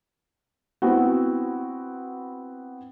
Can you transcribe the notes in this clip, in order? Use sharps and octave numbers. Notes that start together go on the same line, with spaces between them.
B3 C4 E4 F#4